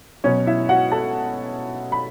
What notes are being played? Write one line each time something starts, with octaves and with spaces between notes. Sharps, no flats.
B2 F#3 C#4 C#5
E4 E5
F#4 F#5
A4 A5
B5